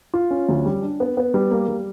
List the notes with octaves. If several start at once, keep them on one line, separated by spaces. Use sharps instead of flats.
F4
C#4
D2
G3
D4
B3
B3
G3
A#3
G3